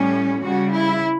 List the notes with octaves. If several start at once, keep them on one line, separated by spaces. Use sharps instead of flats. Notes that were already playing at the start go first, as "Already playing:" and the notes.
Already playing: A2 G3 C#4
C#3 G3 F#4
E4